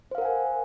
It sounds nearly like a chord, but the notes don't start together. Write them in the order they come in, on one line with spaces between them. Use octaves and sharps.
C5 F5 A#4 F#5 G#5